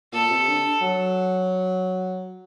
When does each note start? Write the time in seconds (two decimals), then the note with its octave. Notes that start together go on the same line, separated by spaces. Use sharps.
0.13 A#2 A4
0.30 C3
0.48 D3
0.81 F#3